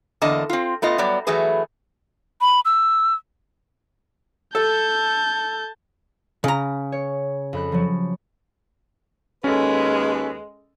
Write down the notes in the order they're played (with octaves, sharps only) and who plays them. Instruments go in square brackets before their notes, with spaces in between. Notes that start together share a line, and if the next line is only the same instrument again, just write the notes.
[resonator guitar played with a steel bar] E2 D3 A#3 D#5 A5
C4 F4
A3 B3 F4 D#5
F#3 G3 B3 D5
E3 F#3 A3 G#4 B4
[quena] B5
E6
[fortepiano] A4 [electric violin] A5 G6
[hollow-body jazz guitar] C#3 A#5
[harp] C#5
F2 B5 F#6
F3 F#3
[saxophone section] D#2 B4 [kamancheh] G#3 [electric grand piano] C#4 A4